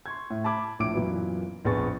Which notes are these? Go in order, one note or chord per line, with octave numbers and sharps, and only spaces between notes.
C6 C#6 G#6
A2
A5 B5 D6 G#6
A#1 A2 D6 D7
F#2 A#2 E3 F#3 B3
A#1 F2 B3 G#4 C#6 A6